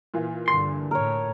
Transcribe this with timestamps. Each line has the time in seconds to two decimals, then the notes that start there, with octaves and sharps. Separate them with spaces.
0.14 A#2 E3 F4
0.48 G2 D3 C6
0.91 A2 A#4 C#5